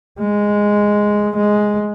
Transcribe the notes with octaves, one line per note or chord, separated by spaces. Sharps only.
G#3
G#3